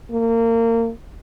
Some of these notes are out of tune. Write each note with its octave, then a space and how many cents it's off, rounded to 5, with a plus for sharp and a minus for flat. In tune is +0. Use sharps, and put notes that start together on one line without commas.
A#3 -30